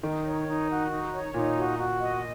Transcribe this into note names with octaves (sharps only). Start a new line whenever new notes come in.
D#3 D#4
C#5
D#4
F#4
D#4
C#5
A#2 D#4
F#4
F#4
D#5